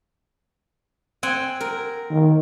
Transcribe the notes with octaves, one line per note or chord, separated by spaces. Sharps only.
C4 F#5 G#5
A#4
D#3